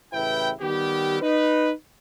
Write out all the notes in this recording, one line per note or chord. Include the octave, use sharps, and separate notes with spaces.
A1 C#3 E4 B4 G5
D#3 G3 B3 G4
D#4 B4